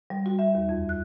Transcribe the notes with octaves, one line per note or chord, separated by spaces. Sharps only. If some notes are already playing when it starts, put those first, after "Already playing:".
G3
F#4
E5
D#2
F2
F#6